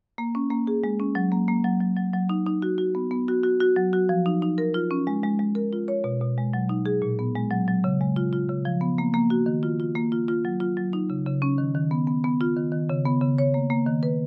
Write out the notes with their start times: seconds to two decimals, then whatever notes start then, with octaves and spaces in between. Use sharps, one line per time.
0.18 A#3
0.35 C#4
0.50 A#3
0.67 G#4
0.84 G#3
1.00 C#4
1.15 F#3
1.32 A#3
1.48 A#3
1.64 F#3
1.80 F#3
1.97 F#3
2.13 F#3
2.29 D#4
2.46 D#4
2.62 F#4
2.78 F#4
2.95 B3
3.11 B3
3.28 F#4
3.43 F#4
3.60 F#4
3.76 F#3
3.93 F#4
4.09 F3
4.26 D#4
4.42 D#4
4.58 A#4
4.74 F4
4.91 C#4
5.07 G#3
5.23 G#3
5.39 G#3
5.55 A#4
5.73 F4
5.88 C#5
6.04 B2
6.21 B2
6.38 G#3
6.53 F#3
6.69 D#4
6.86 G#4
7.02 A#2
7.19 B3
7.35 G#3
7.51 F#3
7.68 F#3
7.84 C#3
8.01 G#3
8.16 F4
8.33 F4
8.49 C#3
8.65 F3
8.81 B3
8.98 A#3
9.14 A#3
9.30 F#4
9.46 D#3
9.63 F4
9.80 F4
9.95 A#3
10.12 F4
10.28 F4
10.45 F#3
10.60 F4
10.77 F#3
10.93 D#4
11.10 C#3
11.26 C#3
11.42 C#4
11.58 D#3
11.75 D#3
11.91 B3
12.07 B3
12.24 B3
12.41 F4
12.56 D#3
12.72 D#3
12.89 C#3
13.06 B3
13.21 C#3
13.38 C#5
13.54 A#3
13.70 A#3
13.87 D#3
14.03 B4